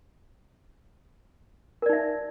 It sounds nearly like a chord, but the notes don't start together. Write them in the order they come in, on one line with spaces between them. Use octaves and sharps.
A#4 D5 D#4 E5